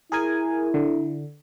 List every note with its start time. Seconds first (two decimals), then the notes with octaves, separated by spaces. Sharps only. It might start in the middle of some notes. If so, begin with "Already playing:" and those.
0.12 E4 G#4 A#4 G#5
0.74 D3